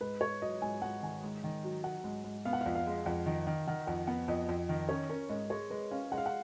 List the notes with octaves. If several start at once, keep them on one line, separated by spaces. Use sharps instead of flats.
G#2 B4
G#2 C#5
F#3 D#5
G#2 G#5
G#2 F#5
D#3 G#5
G#2
D#3
F#3
F#3 F#5
G#2
G#2
B3 F5
F#5
F2 F5
F5
G#3
F2 F#5
D#3
D#3
D#3 F#5
F2 F#5
B3 F#5
F2 D#5
F2
D#3
C#4 C#5
C#4 A#4
G#2 D#5
G#3 C#5
G#3 B4
C#4 F5
G#3 F#5
F5
F#5